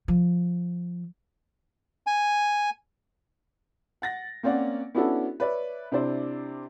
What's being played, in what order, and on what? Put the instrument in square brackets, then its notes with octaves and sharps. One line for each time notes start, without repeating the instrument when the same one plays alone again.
[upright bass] F3
[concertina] G#5
[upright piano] F#5 A6 A#6
A#3 C4 C#4 D5 F#5
B3 C#4 D4 E4 F#4 A4
B4 C#5 D5 E5
C3 D4 E4 C5 D5